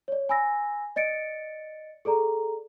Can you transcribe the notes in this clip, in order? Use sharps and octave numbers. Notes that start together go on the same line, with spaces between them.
C#5 D5
G#5 B5 E6 A#6
D5 D#5 A6 C#7 D7
G#4 A4 D5 A#5